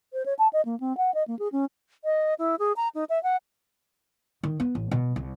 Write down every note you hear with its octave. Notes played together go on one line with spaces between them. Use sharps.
C5
C#5
A5
D#5
A#3
C4
F#5
D#5
A#3
G#4
C#4
D#5
E4
G#4
A#5
D#4
E5
F#5
D#3
B3
A1
B2
C2